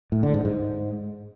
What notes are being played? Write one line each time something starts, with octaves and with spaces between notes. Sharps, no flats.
A2
D3
G#2
G#2